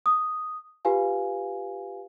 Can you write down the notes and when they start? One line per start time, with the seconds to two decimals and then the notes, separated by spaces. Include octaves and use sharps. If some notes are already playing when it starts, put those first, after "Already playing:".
0.06 D#6
0.85 F4 G4 B4 F5 G#5